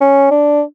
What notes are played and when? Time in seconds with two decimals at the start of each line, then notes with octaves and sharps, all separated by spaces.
0.01 C#4
0.31 D4